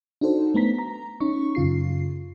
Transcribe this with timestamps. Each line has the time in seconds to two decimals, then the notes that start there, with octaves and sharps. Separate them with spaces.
0.21 D4 D#4 F#4 A4 C5
0.54 A3 B3 A#5 B6
0.79 A#5
1.20 C#4 D#4 C#6
1.55 F#2 C#3 F4 C7